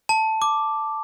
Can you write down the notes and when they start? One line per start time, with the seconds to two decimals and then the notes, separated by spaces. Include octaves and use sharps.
0.09 A5
0.42 D6